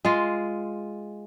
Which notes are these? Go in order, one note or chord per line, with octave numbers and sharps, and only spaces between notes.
G#3 F4